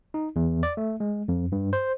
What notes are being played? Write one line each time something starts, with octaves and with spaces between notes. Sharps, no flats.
D#4
E2
D5
A3
G#3
F2
G2
C5